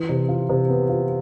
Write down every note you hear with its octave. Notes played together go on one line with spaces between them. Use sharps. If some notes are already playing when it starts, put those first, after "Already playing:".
Already playing: E3
C3
F4
C3
B3
F4